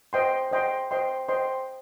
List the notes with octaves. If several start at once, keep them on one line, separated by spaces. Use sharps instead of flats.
C5 D#5 G5 C6
C5 D#5 G5 C6
C5 D#5 G5 C6
C5 D#5 G5 C6